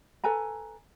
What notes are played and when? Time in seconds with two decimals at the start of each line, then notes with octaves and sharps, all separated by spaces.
0.24 A4 B4 G#5 A#5